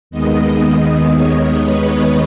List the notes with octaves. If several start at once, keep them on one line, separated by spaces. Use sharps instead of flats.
D#2 D#3 G#3 B3 D#5
C#5
B4